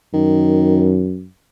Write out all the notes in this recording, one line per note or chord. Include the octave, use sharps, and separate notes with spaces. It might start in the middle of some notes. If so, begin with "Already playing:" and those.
F#2 D#3